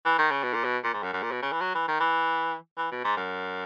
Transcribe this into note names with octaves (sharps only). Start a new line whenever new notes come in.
E3
D#3
C#3
B2
A#2
B2
A#2
G#2
F#2
F#2
A#2
B2
C#3
E3
F#3
E3
D#3
E3
E3
B2
G#2
F#2